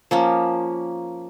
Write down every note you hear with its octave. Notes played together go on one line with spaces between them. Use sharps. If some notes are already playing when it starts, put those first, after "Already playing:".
F3 A#3 C#4